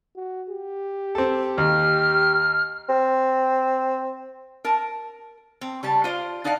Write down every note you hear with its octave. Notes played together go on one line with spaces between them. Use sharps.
F#4
G4
C4 A4
D#2 F6
C4
A#4 A5
C4
C#3 G3 A5
F4 C5 D5 F5
D4 D#4 D5 F5 F#5